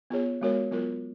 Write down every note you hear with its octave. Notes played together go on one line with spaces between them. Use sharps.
B3 F4 G#4 C#5
G#3 B3 F#4 A#4 C#5
F#3 B3 F4 A#4